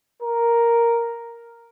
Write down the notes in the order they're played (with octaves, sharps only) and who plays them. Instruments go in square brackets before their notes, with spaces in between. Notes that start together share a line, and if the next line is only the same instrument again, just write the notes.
[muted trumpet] A#4